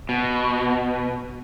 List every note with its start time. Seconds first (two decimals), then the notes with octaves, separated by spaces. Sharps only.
0.09 B2